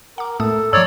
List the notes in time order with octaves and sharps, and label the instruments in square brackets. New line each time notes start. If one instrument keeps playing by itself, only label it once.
[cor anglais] A#4 [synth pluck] F#5 D6
[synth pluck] A2 A3 D#6 [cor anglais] A4
[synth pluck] G2 F3 [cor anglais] D#4 [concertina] C#5 D5 [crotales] E6